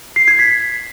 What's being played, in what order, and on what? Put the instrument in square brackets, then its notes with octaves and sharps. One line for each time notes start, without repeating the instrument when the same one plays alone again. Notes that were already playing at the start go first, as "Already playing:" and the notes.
[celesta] C7
G#6
B6